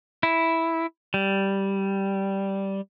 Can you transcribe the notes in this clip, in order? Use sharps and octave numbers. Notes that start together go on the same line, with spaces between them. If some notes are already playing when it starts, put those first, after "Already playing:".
E4
G3